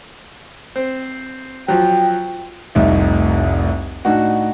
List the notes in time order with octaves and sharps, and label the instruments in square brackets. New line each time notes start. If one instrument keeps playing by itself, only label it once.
[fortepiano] C4
[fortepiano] F3 F#3 [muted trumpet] G5
[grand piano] F1 C2 A2 D#4 E5
A2 D4 D#4 F#4